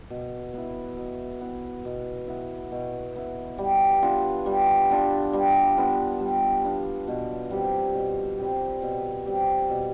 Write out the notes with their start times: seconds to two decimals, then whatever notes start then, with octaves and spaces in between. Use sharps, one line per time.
0.10 B2
0.54 B3 E4
0.97 B2
1.41 B3 E4
1.85 B2
2.28 B3 E4
2.72 B2
3.16 B3 E4
3.58 G3
4.02 B3 D4 F4
4.46 G3
4.90 B3 D4 F4
5.33 G3
5.77 B3 D4 F4
6.20 G3
6.63 B3 D4 F4
7.08 B2
7.51 G3 C4 G4
7.95 B2
8.38 G3 C4 G4
8.82 B2
9.25 G3 C4 G4
9.69 B2